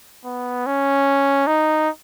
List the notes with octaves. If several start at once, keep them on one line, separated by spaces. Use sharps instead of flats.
B3
C#4
D#4